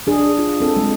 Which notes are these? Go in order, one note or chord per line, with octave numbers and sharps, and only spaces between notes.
D4 G#4
F4
C4 A4
G#3